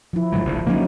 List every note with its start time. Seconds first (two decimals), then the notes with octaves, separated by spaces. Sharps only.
0.13 F3 E4
0.33 G#2 D3 F#3
0.45 D1 A#1
0.67 D3 F#3 A#3 C#4 D#4